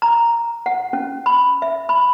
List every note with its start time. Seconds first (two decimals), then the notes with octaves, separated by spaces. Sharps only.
0.02 A#5
0.66 F#5
0.93 C#4
1.26 B5
1.62 E5
1.89 B5